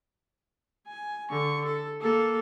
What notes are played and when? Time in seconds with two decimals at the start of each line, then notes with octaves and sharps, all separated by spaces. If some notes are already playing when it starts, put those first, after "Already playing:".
0.88 G#5
1.31 D3 C#6
1.65 A4
2.01 A#3 A4